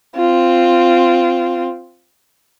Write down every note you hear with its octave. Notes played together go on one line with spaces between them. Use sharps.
C4 F4